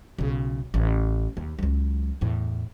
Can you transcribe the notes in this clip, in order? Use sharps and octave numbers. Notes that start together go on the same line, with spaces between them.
B1 C#3
A1
D#2
C#2 F#3
E2 A2